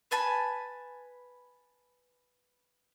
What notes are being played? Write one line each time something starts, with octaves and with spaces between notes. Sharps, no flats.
B4 G#5 A5 B5